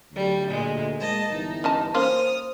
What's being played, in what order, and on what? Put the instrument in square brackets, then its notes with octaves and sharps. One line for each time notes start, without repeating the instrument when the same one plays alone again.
[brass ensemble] D2 [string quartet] F#3 G3
[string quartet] A#2 G#3
[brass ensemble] G#3 A#3 [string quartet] D#5 A5
[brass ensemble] G1 E3 [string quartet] D#4
[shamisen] C#4 D#5 A5
[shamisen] A#3 C#4 F4 [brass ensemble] C5 [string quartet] D#6 F6